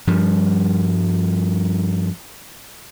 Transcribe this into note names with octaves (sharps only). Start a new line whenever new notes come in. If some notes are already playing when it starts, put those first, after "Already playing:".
G2 F3 G3